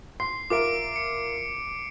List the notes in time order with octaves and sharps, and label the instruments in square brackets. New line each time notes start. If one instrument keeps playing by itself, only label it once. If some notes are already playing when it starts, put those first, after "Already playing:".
[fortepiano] C6 [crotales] C7
[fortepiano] F4 A#4 E5 [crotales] D6 D7
[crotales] C#7